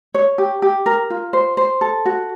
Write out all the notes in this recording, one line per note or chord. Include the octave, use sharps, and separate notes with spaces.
C#5
G4
G4
A#4
F4
C5
C5
A4
F#4